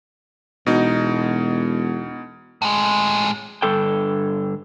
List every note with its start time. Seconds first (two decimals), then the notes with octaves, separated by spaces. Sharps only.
0.66 E1 B2 D#4
2.62 A2 G#3
3.62 G2 D3 A4 G5